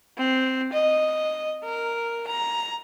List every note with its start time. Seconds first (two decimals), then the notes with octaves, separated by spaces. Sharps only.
0.18 C4
0.73 D#5
1.64 A#4
2.28 A#5